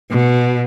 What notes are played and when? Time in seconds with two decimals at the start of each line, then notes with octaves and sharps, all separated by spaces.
0.11 B2